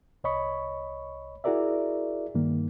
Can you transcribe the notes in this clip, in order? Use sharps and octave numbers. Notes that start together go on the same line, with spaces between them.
C2 C#5 D#5 B5 C#6
E4 F#4 G#4 A#4 D5 E5
G2 D#3 A#3